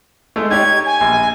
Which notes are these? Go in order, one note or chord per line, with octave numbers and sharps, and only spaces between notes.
G#3 A3
D#4 G4 C#5 G#6
G#5
A#1